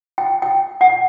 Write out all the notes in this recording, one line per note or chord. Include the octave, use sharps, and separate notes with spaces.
G5
G5
F#5